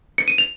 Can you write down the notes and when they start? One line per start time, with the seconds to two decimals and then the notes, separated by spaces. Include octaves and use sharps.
0.18 C#7
0.28 D#7
0.38 F7